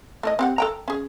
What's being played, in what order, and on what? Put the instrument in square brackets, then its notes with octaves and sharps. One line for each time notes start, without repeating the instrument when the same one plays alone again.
[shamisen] A3 E4 D#5
C4 G4 F#5
A4 G5 A#5
C#4 G#4